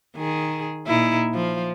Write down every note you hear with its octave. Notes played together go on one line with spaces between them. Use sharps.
D#3 G#4
A#2 D#4 E4
F3